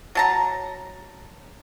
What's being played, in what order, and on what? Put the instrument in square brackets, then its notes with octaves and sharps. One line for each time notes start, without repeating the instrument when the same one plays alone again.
[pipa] F#3 A5 A#5